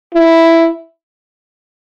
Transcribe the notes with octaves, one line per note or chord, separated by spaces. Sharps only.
E4